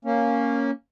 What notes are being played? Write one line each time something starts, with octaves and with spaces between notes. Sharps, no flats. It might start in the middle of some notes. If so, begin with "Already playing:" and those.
A#3 C#4